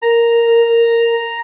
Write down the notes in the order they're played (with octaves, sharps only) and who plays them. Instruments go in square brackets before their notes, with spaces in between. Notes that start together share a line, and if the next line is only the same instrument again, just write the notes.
[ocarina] A#4 [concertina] A#5